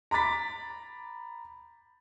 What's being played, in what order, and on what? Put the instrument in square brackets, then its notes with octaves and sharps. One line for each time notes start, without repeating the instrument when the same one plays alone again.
[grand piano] A#5 B5 D6 A6 B6